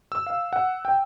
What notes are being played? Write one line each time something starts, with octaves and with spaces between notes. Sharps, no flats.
E6
F5
F#5
G5